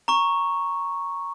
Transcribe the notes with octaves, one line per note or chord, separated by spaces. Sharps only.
A#5 C#6